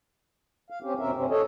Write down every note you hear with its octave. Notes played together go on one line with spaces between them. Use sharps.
F5
C4 C#4 G4
D#2 B2 C4 C#4 A#4 E5
G2 C3 C4 C#4
A4 C#5 D#5